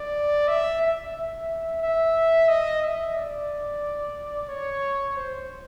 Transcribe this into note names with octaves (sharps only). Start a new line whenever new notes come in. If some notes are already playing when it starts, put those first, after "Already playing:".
Already playing: D5
E5
E5
E5
E5
D#5
E5
D5
C#5
C5